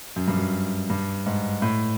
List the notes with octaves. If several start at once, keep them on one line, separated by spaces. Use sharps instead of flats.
F#2
G2
F#2
G2
G#2
A2